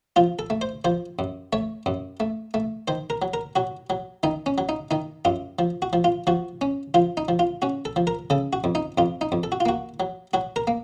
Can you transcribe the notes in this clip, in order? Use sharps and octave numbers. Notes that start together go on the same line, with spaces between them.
F3 F4
A4
A3
C5
F3 C5
F#2
A3 C#5
F#2
A3
A3
D#3 C5
A#4
F#3
A#4
F#3 F#4
F#3
D#3 D#4
C#4
F#3
D#4
D#3 D#4
F#2 F4
F3
F#4
F3
F4
F3 F#4
C#4
F3 F4
D#4
F3
F4
C#4 F#4
A4
F3
A#4
C#3 A4
F#4
F2
D#4
F2 F4
D#4
F2
A4
F#4
F4
A#3 F#4
F#3
F#3 F#4
A#4
A#3